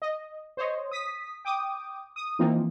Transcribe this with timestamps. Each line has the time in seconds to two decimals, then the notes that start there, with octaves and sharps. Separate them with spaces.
0.02 D#5
0.57 C5 C#5 D#5
0.91 D#6 B6
1.45 G5 D6 D#6
2.16 D#6
2.39 E3 F3 A#3 C4 D#4